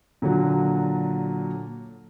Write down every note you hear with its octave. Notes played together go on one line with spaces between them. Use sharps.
A#2 D3 F#3 F#4